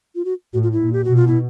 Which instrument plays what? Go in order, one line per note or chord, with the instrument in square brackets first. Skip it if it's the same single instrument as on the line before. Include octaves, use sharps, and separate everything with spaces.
[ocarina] F4
F#4
[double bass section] A2 [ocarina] F#4
[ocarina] F4
E4
[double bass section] A#2
[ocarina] G4
F#4
[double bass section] B2
[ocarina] F4
E4